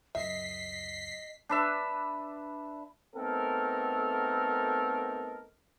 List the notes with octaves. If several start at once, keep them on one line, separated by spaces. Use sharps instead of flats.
C#2 F#2 D#5 E5 B6 C7
D4 B4 E5
A3 B3 C4 D#4 A4 A#4